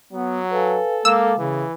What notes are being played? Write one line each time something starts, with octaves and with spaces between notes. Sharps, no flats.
F#3 B3
A4 B4 F5 G#5
G#3 A#3 F5 D6 E6
C#3 E3 E5